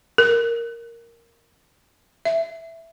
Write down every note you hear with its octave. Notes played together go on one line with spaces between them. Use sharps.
A#4
E5